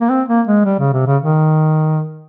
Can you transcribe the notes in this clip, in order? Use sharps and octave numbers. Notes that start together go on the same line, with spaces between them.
A#3
C4
A#3
G#3
G3
C#3
C3
C#3
D#3